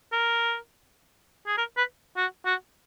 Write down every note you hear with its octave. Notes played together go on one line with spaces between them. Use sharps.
A#4
G#4
A#4
B4
F#4
F#4